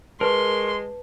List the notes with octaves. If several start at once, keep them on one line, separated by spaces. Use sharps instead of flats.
G#3 A#4 B4 A5 C6 C#6